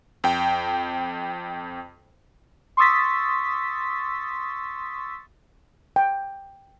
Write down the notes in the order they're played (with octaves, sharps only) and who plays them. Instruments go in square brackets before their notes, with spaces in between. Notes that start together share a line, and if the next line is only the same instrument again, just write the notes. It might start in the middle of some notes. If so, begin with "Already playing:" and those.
[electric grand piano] F2 G5
[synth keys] C6 C#6 D#6 E6 A6 B6
[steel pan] G5